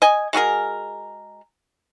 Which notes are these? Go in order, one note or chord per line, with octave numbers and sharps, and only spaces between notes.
D#5 G#5
G#3 F#4 G#4 A#4